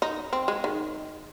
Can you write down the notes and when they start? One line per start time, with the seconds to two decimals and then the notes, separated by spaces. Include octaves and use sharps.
0.02 D#4
0.33 C4
0.48 G#3
0.64 D#3